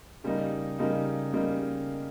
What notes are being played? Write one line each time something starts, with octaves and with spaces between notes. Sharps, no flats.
C#3 G3 A#3 D#4
C#3 G3 A#3 D#4
C#3 G3 A#3 D#4